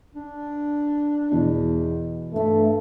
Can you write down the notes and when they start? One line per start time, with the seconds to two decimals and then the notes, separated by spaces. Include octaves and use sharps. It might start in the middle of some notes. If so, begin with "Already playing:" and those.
0.15 D4
1.31 E2 B2 E3
2.34 G2 A3